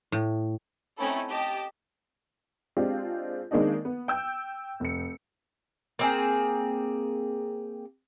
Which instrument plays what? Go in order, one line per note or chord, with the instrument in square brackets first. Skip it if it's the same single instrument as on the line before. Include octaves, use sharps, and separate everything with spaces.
[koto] A2
[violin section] A3 C4 C#4 D#4 E4 A4
G4 D#5 A5
[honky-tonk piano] G#3 C4 D4 F4 G4
D#3 G#3 A#3 C4 D4 D#4
B3
G5 E6 G6
F1 C#7
[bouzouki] A#3 C4 G#4